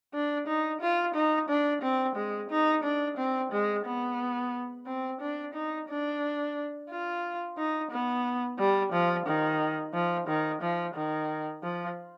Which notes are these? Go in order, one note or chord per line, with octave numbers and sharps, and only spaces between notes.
D4
D#4
F4
D#4
D4
C4
G#3
D#4
D4
C4
G#3
B3
C4
D4
D#4
D4
F4
D#4
B3
G3
F3
D#3
F3
D#3
F3
D#3
F3